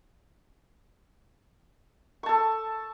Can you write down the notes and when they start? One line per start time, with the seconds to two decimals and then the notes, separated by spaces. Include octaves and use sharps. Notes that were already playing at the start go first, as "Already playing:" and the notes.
2.23 C#6
2.26 A5
2.29 A4